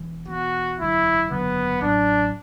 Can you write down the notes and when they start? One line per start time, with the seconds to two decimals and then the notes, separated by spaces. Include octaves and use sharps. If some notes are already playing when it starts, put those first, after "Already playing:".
Already playing: E1 E2 E3
0.28 E1 E2 E3 B3 F#4
0.79 F#1 E2 D3 F#3 E4
1.31 F#1 E2 D3 F#3 B3
1.82 A1 A2 F#3 D4